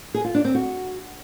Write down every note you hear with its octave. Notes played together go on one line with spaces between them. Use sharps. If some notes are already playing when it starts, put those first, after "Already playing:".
G#4
F4
D4
C4
F#4